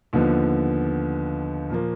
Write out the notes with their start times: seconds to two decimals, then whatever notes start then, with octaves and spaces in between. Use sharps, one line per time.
0.13 D#2 D3 F3 B3
1.70 A#2 F3 A#3